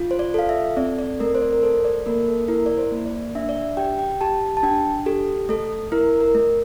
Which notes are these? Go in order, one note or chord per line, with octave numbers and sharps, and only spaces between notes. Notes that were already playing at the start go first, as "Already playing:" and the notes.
Already playing: F4
C5
D5
A4 F5
E5
C4 D5
D5
A3 A#4
C5
D5
A#4
A4 C5
D5
A#3 A#4
A4
E4 A#4
D5
C5
A#3
D5
D4 E5
D5
E5
G4 G5
G5
G4 A5
A5
D4 G5
G4 A4
A3 A4
E4 A#4
A#4
A3